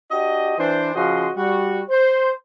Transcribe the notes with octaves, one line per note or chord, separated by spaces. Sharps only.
D4 F#4 G4 D#5
E3 D4 C5
C#3 F3 F#4 D#5 C6
G3 F#4
C5